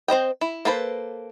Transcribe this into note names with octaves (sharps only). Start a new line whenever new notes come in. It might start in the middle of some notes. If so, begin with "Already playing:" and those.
C4 C5 D#5 G5
E4
A#3 A4 B4 C5